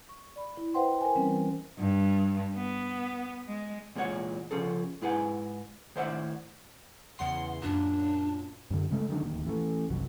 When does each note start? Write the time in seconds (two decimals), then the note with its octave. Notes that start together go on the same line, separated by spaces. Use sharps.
0.09 C#6
0.36 D5 B5
0.57 E4
0.74 B4 C5 E5 F#5 G5 C6
1.01 A#4 C5 G#5
1.16 E3 G3 C4 C#4
1.78 G2
2.55 B3
3.48 G#3
3.95 E2 A#2 G#3 E4 C#5 F#5
4.51 C#3 F3 C#4 G#4 A4
5.02 G#2 E4 G#4 B4 F#5 G#5
5.96 A2 D#3 C5 D5 E5 F#5
7.19 E2 C#3 F#5 C6
7.62 F#2 A#2 D4
8.71 F#2 D3
8.91 C#3 G#3 A3
9.09 D3 D#3 F#3 D4
9.23 D1 D#2
9.45 A1 E3 A3
9.89 F#1 C2 F#3